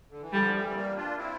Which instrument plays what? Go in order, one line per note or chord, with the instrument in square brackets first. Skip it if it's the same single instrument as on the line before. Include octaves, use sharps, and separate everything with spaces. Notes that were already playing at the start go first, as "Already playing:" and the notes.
[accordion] D3
E3
[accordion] D3 F3 [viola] G3
[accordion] E3 G3
C4
G3 A#3
D4 F4
C4 E4